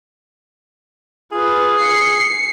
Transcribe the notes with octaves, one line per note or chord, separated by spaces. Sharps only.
F4 G#4 B4
C7 C#7